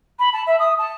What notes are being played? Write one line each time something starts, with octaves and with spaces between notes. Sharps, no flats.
B5
A5
E5
D#6
A5